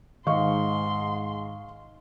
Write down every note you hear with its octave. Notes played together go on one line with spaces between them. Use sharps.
G#2 D#3 D#5 F5 C6 C#6